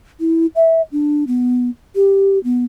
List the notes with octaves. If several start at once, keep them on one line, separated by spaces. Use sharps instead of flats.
E4
E5
D4
B3
G4
B3